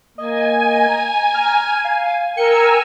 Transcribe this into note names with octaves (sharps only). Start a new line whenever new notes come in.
A#3 D#5 G#5
A#5
F6
F5
A#4 G5 G#5 A#5 E6 C#7